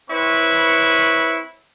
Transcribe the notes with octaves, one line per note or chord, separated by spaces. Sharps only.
C4 E4 B4 C#5 B5 C#6